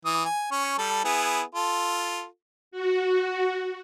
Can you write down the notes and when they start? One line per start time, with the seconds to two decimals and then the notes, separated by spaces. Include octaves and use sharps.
0.05 E3 D#6
0.25 G#5
0.51 C#4 C#6
0.78 G3 A4
1.04 B3 E4 G#4
1.55 F4 A4
2.71 F#4